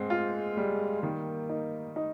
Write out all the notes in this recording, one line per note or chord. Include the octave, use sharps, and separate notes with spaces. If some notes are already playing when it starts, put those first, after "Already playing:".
Already playing: G#2 G#3 C4
F4
G3
D#3 A#3
D#4
D#4